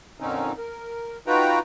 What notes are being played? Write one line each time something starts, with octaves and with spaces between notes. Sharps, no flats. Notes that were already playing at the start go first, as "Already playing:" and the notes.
F2 A#2 D3 C4 C#4 D#4
A#4
D#4 F4 F#4 B4 G5 A#5